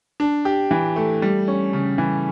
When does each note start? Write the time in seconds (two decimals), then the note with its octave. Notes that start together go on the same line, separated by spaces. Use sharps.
0.20 D4
0.45 G4
0.71 E3
0.96 A3
1.22 G3
1.48 C#4
1.73 C#3
1.98 E3